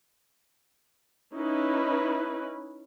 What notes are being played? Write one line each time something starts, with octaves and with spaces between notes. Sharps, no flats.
C#4 D#4 E4 B4